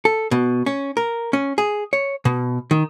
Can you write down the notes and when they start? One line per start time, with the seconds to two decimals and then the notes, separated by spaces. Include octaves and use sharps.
0.05 A4
0.31 B2
0.66 C#4
0.97 A#4
1.33 C#4
1.58 G#4
1.93 C#5
2.25 B2
2.71 D#3